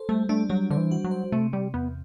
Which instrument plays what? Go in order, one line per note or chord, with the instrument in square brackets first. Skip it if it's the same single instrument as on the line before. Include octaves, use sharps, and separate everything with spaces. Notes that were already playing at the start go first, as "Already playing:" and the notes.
Already playing: [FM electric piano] A4 C5
[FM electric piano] G3 [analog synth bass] A3
[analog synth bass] A3 [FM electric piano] D4
[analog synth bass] F#3 [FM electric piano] G3
[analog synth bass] D3 [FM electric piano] C5
[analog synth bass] E3
[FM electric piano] F#4
[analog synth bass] F#3
[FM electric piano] C5
[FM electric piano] C3 [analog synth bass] A3
[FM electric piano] C3 [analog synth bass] G3
[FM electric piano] E2 [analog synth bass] B3